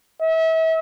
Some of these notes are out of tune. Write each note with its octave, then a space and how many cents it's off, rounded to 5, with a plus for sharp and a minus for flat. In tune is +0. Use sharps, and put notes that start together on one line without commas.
E5 -35